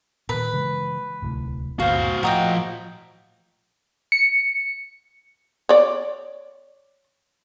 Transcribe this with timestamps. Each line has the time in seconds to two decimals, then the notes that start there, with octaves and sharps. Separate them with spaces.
0.29 A#2 D#3 B4
0.54 C#3 E3 G#3
1.22 D1 C2 A2
1.80 G1 D2 A#2 F#4 C5 F5
2.23 A2 F3 F#4 D#5 G5 A#5
4.12 C#7
5.69 C#5 D5